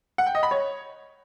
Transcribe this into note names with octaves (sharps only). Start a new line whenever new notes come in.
F#5
G5
D#5
B5
C#5